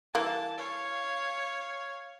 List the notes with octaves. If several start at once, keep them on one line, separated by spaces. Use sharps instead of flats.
E3 G3 A#3 A5
C#5 F5